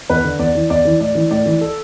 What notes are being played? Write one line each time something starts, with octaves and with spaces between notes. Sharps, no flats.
E2 B4
D3
E2 D5
E3
E2 D5
E3
A2 D5
E3
A2 D5
E3
A4